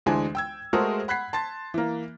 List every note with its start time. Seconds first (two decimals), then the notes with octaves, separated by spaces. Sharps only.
0.06 D2 E3 G#3 D4 G#5
0.35 G5 E6 G#6
0.73 G#3 A3 F#4 G#4 A#4 C5
1.08 F#5 B5 F#6 G#6 B6 C7
1.33 A5 C6 A6
1.74 E3 A#3